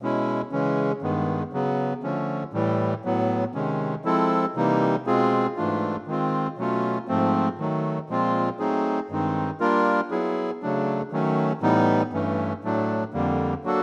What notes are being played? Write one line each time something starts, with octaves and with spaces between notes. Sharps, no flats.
B2 G#3 C#4 E4
C#3 E3 G#3 C#4
G2 D#3 G#3 B3
C#3 F#3 B3
D3 F3 A3 C#4
A2 E3 G3
A2 F#3 B3
C3 D#3 G#3 C#4
F3 G#3 C4 E4 A4
C3 E3 G3 A#3 D#4
B2 G#3 C4 F4 G#4
G#2 E3 A3 D4 F4
D#3 G#3 C4 F4
B2 F#3 A3 C#4 F4
G#2 F3 A3 C4
D#3 F#3 A3
A#2 F3 G#3 C4 F4
F#3 A3 C4 D#4 G#4
G2 D#3 G#3 C4 D#4
G3 A#3 D4 F4 A#4
F#3 B3 E4 G#4
C#3 F#3 A3 D4
D#3 F#3 A3 C#4
A2 E3 G3 B3 D#4
G2 E3 A3 C#4
A2 F#3 A3 D4
F2 D3 G3 A#3
F#3 A#3 D4 F#4 A4